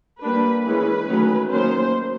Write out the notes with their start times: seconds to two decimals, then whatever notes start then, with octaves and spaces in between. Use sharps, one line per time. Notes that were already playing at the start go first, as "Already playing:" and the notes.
0.22 G3 A#3 D4 B4
0.65 E3 G#3 C#4 B4
1.08 D#3 F#3 A3 C#4
1.50 D#3 F#3 A#3 C#4 C5